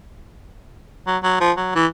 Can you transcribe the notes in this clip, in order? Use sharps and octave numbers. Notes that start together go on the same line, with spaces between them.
F#3
F#3
F3
F#3
E3